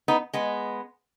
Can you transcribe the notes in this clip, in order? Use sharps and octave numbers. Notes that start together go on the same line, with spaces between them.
B3 D#4
G#3 B3